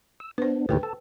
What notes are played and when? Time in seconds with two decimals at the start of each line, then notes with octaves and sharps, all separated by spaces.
0.20 E6
0.38 B3 D4 B4 C5
0.69 D#2 A2 D3 G4 B4 G5
0.83 A4 A5